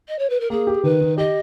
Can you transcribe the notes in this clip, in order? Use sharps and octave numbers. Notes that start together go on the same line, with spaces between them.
D#5
C#5
B4
A#4
A#3 G#4
G4
D#3 B4
D#3
G4 D#5